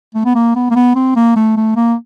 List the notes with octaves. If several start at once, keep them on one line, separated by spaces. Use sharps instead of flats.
A3
B3
A#3
B3
A#3
B3
C4
A#3
A3
A3
A#3